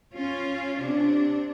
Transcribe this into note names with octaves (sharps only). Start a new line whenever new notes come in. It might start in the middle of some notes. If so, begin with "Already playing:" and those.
C#4 F4
C3 D4